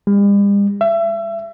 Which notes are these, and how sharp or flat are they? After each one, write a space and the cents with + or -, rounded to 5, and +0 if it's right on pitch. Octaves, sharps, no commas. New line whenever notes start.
G3 +45
E5 +30